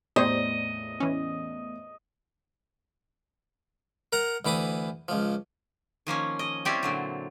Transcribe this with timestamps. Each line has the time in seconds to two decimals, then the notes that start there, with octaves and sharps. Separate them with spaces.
0.16 E2 A2 G4 C5 C#5 D#5
1.00 E3 C#4
4.13 A#4 F#5 A#5
4.45 D2 E3 B5 D6 D#6
5.08 C#2 F3
6.07 D#3 F3 A#3 C#4
6.39 D#5
6.65 G3 C4 C#4 E4 G4 D5
6.83 A#2 D3 F#3